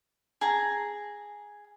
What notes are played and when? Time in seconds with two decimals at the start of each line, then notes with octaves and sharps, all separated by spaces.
0.41 G#4 A#5